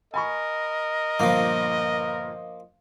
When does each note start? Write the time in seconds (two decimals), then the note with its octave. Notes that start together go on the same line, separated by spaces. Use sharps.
0.14 A#4 D#5 G#5 B5 C#6
1.20 G1 A#2 F3 A#3